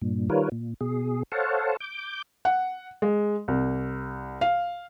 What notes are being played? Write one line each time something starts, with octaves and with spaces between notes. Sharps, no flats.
G2 A#2
D#3 G3 F4 A#4 B4 C#5
A#2
B2 G#4
A4 C5 C#5 F5 F#5 A5
D6 G6
F#5
G#3
C2
F5